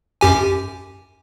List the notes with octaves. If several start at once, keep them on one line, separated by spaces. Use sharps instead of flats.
F#2 G4 G#5